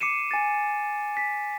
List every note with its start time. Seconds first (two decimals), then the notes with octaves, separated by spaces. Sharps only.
0.01 D6 C7 C#7 D#7 E7
0.31 G#5 A6
1.17 B6